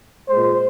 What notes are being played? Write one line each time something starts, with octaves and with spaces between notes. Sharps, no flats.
A#2 G#3 C5